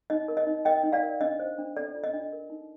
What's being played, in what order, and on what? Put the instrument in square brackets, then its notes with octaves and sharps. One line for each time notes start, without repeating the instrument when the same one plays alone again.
[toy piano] D#4 D#5
A#4
D#5
D#4
A#4 D#5 G5
D#4
D5 F5
A#4
D4 D#5
C5
D4
A4 D5
F4
D#5
D4
A#4
D#4